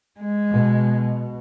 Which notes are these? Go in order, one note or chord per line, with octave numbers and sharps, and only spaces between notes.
G#3
B2